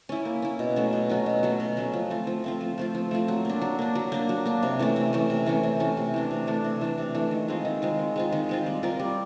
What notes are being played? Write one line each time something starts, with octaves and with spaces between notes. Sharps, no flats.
C#4 E4
A#3
C#4 E4
B2
F#3 A3 C#4
B2
F#3 A3 C#4
B2
F#3 A3 C#4
B2
F#3 A3 C#4
F3
A3 C4 F4
F3
A3 C4 F4
F3
A3 C4 F4
F3
A3 C4 F4
F#3
A#3 D4
F#3
A#3 D4
F#3
A#3 D4
F#3
A#3 D4
C3
E3 A3 C#4
C3
E3 A3 C#4
C3
E3 A3 C#4
C3
E3 A3 C#4
C3
E3 A3 D4
C3
E3 A3 D4
C3
E3 A3 D4
C3
E3 A3 D4
D#3
G#3 C4 F4
D#3
G#3 C4 F4
D#3
G#3 C4 F4
D#3
G#3 C4 F4
G3
C4 F4 A#4
G3